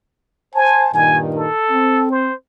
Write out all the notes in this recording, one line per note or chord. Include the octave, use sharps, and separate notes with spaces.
C5 G#5 A5
G2 A#2 D#3 G#5
A4
C4
C5